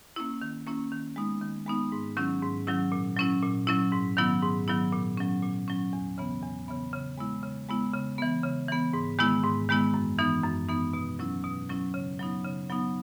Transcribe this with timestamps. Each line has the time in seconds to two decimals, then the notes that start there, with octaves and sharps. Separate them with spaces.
0.16 A#3 C#4 E4
0.42 D#3
0.67 A#3 C#4 E4
0.92 D#3
1.16 G#3 B3 D#4
1.41 D#3
1.67 G#3 B3 D#4
1.92 G#2
2.17 D#3 F#3 C#4 E4
2.42 G#2
2.67 D#3 F#3 C#4 E4
2.92 A#2
3.17 F#3 C#4 E4
3.43 A#2
3.67 F#3 C#4 E4
3.92 G#2
4.17 D#3 F#3 B3 E4
4.42 G#2
4.68 D#3 F#3 B3 E4
4.92 A#2
5.17 F#3 C#4
5.42 A#2
5.68 F#3 C#4
5.93 E2
6.18 C#3 E3 B3
6.43 E2
6.68 C#3 E3 B3
6.93 C#3
7.18 G#3 B3 E4
7.43 C#3
7.69 G#3 B3 E4
7.93 C#3
8.18 E3 B3
8.44 C#3
8.68 E3 B3
8.94 G#2
9.19 D#3 G#3 B3 E4
9.43 G#2
9.69 D#3 G#3 B3 E4
9.94 F#2
10.19 E3 B3 D#4
10.44 F#2
10.69 E3 B3 D#4
10.93 B2
11.19 F#3 C#4 E4
11.44 B2
11.69 F#3 C#4 E4
11.94 C#3
12.19 F#3 B3 D#4
12.44 C#3
12.69 F#3 B3 D#4